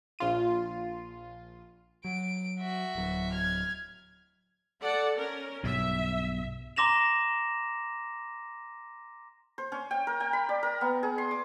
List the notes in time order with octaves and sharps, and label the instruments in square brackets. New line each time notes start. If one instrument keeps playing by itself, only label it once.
[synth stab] A#1 F4 D#7
[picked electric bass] F#3 [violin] D7
[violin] F#4 E5
[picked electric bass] D1 F#3
[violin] F6 G#6
[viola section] A4 D5 F#5
C#4 A#4
[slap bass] B1 G2 B2 [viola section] E5
[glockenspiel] A#5 C6 D6 A#6 E7 F7
[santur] C5
C#4
G5
A#4
G5
B5
D5
A#4
B3
G#4
C6
D6